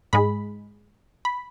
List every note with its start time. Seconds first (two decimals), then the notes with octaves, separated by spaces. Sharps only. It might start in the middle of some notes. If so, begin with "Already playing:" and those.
0.13 G#2 G#3 B5
1.25 B5